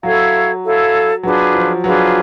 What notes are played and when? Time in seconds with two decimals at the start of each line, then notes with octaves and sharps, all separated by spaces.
0.03 F#3 E4 A4 C#5 F5
0.63 E4 A4 C#5 F5
1.23 F#3 D4 F4 G#4 B4
1.54 F3
1.84 F#3 D4 F4 G#4 B4